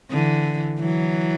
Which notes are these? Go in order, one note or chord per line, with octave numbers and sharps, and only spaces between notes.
D3 E3
E3 F#3